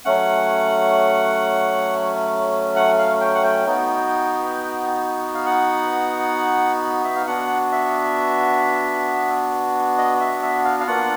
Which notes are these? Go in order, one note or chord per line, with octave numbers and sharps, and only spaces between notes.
F#3 A3 C#4 F#5
F#5
F5
G5
F#5
G5
B3 D#4 F#4
F5
F#5
E5
F5
B3 D4 F#4 F#5
E5
D#5
E5
E5
F5
F5
A#3 D4 F4 F#5